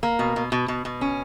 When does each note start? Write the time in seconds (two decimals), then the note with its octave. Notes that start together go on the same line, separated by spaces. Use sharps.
0.03 A#3
0.19 B2
0.36 B2
0.52 B2
0.68 B2
0.85 B2
1.01 C#4